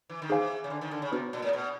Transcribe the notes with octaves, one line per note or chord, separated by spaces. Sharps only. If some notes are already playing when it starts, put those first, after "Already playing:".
E3
D#3
E3 D#4 G#4 C5 F5 G#5
C#3
D3
D#3
D3
C#3
C3 B3 D4 F#4 B4
A#2
A2
B2